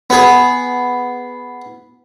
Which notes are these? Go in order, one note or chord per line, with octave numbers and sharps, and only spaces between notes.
B3 G#4